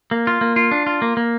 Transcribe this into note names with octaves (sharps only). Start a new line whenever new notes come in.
A#3
F4
A#3
F4
D4
F4
A#3
A#3